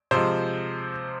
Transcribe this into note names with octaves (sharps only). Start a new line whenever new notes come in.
C3 F3 G#3 C5